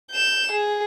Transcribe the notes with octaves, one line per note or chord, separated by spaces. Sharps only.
G6 E7
G#4